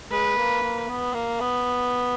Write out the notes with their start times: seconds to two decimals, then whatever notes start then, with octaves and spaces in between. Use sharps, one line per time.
0.11 G#3 B4
0.37 A#3
0.62 A#3
0.88 B3
1.14 A#3
1.40 B3